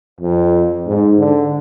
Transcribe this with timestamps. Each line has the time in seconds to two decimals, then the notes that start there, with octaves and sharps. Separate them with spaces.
0.21 F2
0.86 G#2
1.19 D3